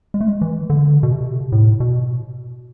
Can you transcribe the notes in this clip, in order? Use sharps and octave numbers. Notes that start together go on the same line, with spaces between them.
G#3
A3
G#3
E3
D3
B2
C3
A2
B2